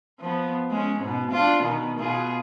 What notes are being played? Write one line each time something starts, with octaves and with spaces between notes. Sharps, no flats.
F3 B3
G#3 C#4
G#2 B2
D4 F4
B2 D#3
B2 F4 G#4